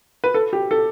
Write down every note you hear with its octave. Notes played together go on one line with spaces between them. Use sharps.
B4
A4
G4
A4